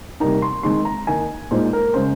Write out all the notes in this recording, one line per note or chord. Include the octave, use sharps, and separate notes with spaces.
C3 G3 A#3 D#4 A#5
C6
D#3 G#3 C4 D#4 C6
A#5
D#3 A#3 D#4 G#5
A#2 G#3 D#4 C5
A#4
C#3 G#3 C#4 C5